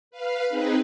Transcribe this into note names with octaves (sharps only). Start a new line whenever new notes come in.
B4 F5
C4 D#4 G#4 B4